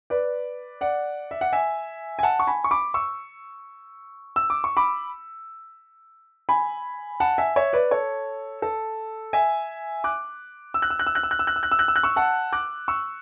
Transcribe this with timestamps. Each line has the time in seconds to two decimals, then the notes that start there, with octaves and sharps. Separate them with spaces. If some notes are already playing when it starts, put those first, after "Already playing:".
0.10 B4 D5
0.81 D5 F#5
1.31 E5
1.41 F#5
1.53 E5 G#5
2.19 G#5
2.23 F#5 A5
2.40 C#6
2.47 G#5 B5
2.64 C#6
2.71 B5 D6
2.94 C#6 E6
4.36 E6
4.50 D6
4.64 C#6
4.77 B5 D6
6.49 G#5 B5
7.20 F#5 A5
7.38 E5 G#5
7.56 C#5 E5
7.73 B4 D5
7.91 A4 C#5
8.62 A4
9.33 E5 G#5
10.04 D6 F#6
10.74 E6
10.82 F#6
10.90 E6
10.99 F#6
11.07 E6
11.15 F#6
11.23 E6
11.31 F#6
11.39 E6
11.47 F#6
11.56 E6
11.63 F#6
11.72 E6
11.79 F#6
11.88 E6
11.96 F#6
12.03 C#6 E6
12.16 F#5 A5
12.52 D6 F#6
12.88 C#6 E6